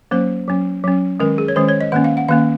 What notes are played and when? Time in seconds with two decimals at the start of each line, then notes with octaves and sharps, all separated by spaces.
0.11 F#3 A#3 C#4 C5
0.48 F#3 C#4
0.84 F#3 C#4
1.20 D#3 G#3 C#4 A#4
1.38 G#4
1.48 C#5
1.56 D#3 G#3 C#4 C5
1.69 C#5
1.81 D#5
1.92 D#3 A#3 C#4 F#5
2.04 F5
2.17 F#5
2.29 D#3 A#3 C#4 F5